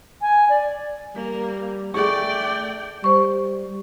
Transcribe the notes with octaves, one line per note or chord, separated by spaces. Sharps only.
G#5
D5
G3 A#3
A3 G#4 D5 G5 C#6
G3 C5 C#6